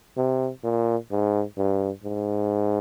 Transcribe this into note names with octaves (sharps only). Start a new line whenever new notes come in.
C3
A#2
G#2
G2
G#2